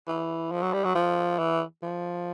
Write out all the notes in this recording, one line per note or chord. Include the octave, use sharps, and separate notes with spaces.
E3
F3
F#3
G3
F#3
F3
E3
F3